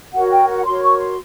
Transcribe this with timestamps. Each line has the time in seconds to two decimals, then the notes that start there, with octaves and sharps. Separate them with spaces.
0.13 F#4 A#4 C#5 F#5
0.31 G5
0.49 F#5
0.65 F#4 A#4 C#5 C6
0.82 C#6
0.99 C6